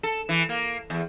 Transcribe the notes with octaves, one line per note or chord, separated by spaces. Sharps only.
A4
E3
A#3
E2